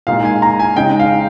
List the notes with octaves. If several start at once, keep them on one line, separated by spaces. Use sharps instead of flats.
A#2 G#3 D#4 F5
G#5
A#5
G#5
C#3 G#3 D#4 G5
F5